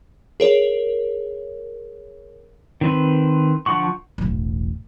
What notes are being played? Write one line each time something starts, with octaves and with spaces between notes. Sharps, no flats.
G#4 A#4 C#5
D#3 C4 B4
D3 F3 F#5 C#6
E1 A1